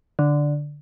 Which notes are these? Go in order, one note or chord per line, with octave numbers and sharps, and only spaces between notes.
D3